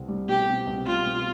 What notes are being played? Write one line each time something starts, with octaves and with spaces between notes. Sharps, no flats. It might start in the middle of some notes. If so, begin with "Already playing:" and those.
Already playing: C2 C4
G3
B2 G4
C4
C2
G3 F4
B2